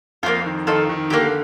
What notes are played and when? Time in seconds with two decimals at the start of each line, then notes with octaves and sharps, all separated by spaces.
0.23 F2 F3 A#3 D4 F4
0.45 D#3
0.67 D#3 F4 A4 D#5
0.89 D#3
1.10 D3 A#3 D4 G4